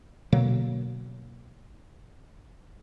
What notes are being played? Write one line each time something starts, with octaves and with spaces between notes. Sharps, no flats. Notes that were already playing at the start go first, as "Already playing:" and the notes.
B2 D3 F#3 A#3